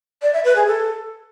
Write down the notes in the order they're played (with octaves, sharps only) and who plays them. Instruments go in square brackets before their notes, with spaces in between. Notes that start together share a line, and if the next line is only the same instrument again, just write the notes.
[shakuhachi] D5
E5
B4
G#4
A4